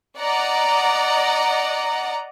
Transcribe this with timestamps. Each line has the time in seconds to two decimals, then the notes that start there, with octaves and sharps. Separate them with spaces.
0.18 D5 D#5 F#5 A#5